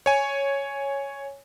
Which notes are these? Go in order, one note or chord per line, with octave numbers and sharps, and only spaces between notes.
C#5 G#5